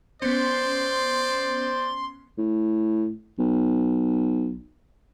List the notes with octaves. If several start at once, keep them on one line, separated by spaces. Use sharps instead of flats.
B3 C#4 C5 D5 C6
A2
B1